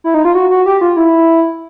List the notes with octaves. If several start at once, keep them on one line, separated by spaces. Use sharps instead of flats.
E4
D#4
F4
F#4
F#4
G4
F4
E4